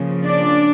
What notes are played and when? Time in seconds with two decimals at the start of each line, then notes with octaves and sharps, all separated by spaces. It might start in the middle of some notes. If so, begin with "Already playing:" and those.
Already playing: C#3 F3 A#3
0.24 D4 D5